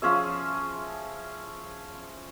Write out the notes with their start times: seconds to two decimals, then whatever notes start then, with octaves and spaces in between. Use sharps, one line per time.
0.02 F3 C#4 G#4 E5